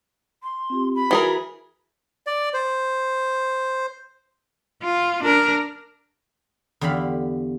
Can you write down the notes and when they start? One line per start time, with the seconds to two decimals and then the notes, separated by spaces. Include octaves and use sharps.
0.43 C6
0.70 C4 F4 G4
0.95 B5
1.11 E3 F#4 G#4 A#4
2.27 D5
2.54 C5
4.82 F4
5.23 D4 A#4
6.81 E2 D3 G4 F5 B5